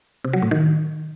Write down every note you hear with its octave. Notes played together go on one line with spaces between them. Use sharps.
C3
F#3
A2
D#3